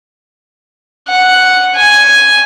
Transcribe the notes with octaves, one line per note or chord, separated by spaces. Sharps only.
F#5
G#5